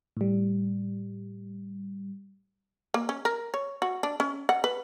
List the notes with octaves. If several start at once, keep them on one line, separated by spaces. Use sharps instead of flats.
A2 G3
A#3
C#4
A#4
C#5
F#4
D4
C#4
F#5
B4